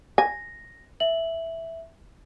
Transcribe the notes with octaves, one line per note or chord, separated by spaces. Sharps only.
G#5 A#6
E5 F#7